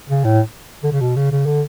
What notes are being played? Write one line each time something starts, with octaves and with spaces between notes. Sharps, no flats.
C#3
A2
D3
C#3
B2
C#3
C#3
D3